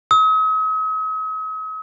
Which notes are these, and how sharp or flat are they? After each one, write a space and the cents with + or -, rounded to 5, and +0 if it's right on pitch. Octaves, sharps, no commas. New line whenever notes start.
D#6 +45